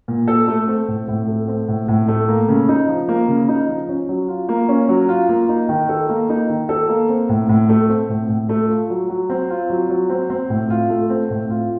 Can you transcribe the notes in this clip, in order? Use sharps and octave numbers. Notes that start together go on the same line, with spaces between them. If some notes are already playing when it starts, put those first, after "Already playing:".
A#2
A4
A3
C4
A2
A2
A3
C4
A2
A2
A3
A#3
C#3
D#4
F3
A#3
C#3
D#4
F3
C#4
F#3
F4
A#3
C#4
F#3
F4
A#3
D#4
D#3
A4
A#3
D#4
D#3
A4
A#3
C4
A2
A2
A3
C4
A2
A2
A3
F4
F#3
F#3
C4
F4
F#3
F#3
C4
C4
A2
F4
A3
C4
A2
F4